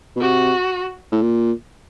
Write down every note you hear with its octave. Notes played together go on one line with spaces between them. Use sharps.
B2
C3 F#4
A2
A#2